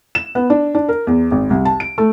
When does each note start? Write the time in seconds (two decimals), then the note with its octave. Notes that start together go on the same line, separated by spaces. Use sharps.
0.15 E7
0.35 B3
0.50 D4
0.75 D4
0.89 A#4
1.07 E2
1.31 G#1
1.50 C2
1.65 A5
1.80 D7
1.98 A3